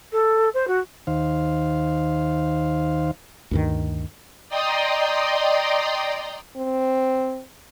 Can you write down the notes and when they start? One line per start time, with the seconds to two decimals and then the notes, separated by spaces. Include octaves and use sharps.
0.12 A4
0.54 C5
0.67 F#4
1.07 D#2 D#3 C5 F5
3.51 D2 G2 D#3
4.49 D5 D#5 G5 A#5 C6 D#6
6.57 C4